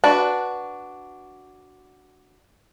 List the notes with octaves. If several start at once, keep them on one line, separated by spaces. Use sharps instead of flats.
D4 F#4 B4